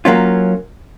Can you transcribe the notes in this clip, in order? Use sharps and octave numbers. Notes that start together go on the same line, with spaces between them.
F#3 A#3 C#4 F4